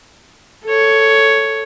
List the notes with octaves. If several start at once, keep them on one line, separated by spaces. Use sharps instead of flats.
A4 C#5